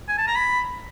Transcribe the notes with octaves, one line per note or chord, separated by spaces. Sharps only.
G#5
A5
A#5
B5